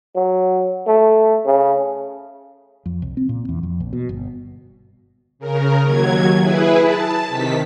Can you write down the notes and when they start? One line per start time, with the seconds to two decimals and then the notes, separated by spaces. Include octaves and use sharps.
0.16 F#3
0.87 A3
1.45 C#3
2.86 F2
3.02 C2
3.17 C4
3.29 A#2
3.49 E2
3.63 F2
3.80 A#1
3.93 B2
4.09 G1
5.39 C#3 A#4
5.82 D#2 F#3 G#6
6.39 E4 G#4 B4
6.81 A5
7.28 C3 D#3 B6